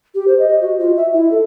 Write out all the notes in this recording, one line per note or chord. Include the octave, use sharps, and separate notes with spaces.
G4
C5
D#5
F#4
F4
E5
E4
A4